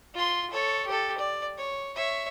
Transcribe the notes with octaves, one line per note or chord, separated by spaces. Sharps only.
F4 C6
A4 C#5
G4 A4
D5
C#5
C#5 E5